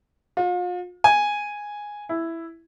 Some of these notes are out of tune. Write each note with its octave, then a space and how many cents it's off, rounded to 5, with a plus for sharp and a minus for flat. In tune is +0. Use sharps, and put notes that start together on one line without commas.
F4 +40
G#5 -5
E4 +5